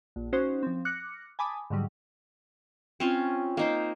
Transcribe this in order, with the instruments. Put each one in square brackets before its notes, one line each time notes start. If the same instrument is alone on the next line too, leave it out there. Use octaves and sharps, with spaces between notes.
[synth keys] A#1
C#4 D#4 F#4 C5
F3 C4
D6 F6 F#6 A#6 C#7
G#5 A5 B5 D6 D#6
G#2 D3 F#3 G3
[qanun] C4 C#4 F4
A#3 D#4 C5